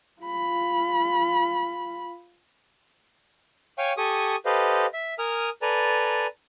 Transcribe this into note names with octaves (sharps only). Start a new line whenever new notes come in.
F4 B5
C#5 F5 G5 G#5 C#6
G4 A4 G#5 C#6 D#6
G4 A4 B4 C5 D#5 F5
E5
A#4 G#5 D#6 F6
A4 B4 D5 G#5 A#5